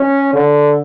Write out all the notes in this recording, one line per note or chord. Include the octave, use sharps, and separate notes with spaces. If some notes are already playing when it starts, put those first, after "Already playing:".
Already playing: C#4
D3